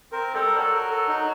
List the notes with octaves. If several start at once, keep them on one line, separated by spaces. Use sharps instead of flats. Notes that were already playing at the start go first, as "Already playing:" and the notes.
C4 A#4
G3 A4
A#4
F#3 A4
A#4
A4
D#4